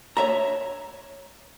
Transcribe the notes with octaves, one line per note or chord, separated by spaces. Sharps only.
C#5 E5 A#5